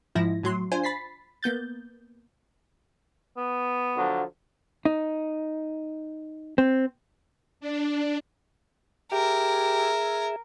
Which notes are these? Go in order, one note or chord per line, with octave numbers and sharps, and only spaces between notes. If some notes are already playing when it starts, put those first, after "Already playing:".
G#2 F3 E4 A#6
A2 F#3 C6
D4 F4 C5 G#5
B5 A6 B6 C7
A#3 B3 G6 A6
B3
D3 F3 F#3
D#4
C4
D4
G4 G#4 A#4 E5